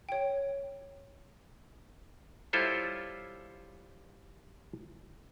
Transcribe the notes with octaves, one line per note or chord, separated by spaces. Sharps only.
C#5 G5
G3 E4 F4 A4 C5 C#5